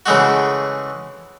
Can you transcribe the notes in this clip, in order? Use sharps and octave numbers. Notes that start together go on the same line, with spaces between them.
C#3 E3 G#3 A3 F#4